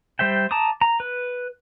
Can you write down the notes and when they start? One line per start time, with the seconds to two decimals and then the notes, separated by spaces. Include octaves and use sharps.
0.19 G3 C5 E5 G5
0.51 A5 A#5 D6 D#6
0.81 A#5
1.00 B4